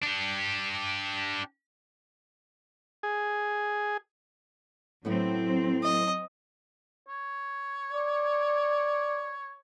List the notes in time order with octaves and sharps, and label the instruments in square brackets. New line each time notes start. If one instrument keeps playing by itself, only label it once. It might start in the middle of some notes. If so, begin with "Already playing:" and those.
[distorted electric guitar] D4 G4
[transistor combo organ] G#4
[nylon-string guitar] A2 B3 E4 [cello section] F#3 C4
[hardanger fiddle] D#5
[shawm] C#5
[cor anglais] D5